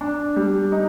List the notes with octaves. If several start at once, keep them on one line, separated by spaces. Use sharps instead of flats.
D4
G3
D#4